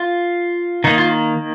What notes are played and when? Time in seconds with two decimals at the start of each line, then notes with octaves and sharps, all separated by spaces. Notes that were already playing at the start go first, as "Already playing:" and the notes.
Already playing: F4
0.84 D#3 A#3 D#4
0.98 F4